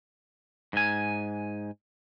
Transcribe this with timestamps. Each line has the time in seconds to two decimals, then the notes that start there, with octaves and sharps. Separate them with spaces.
0.73 G#2 G#5